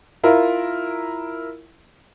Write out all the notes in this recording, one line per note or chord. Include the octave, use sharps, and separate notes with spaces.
E4 F4 A#4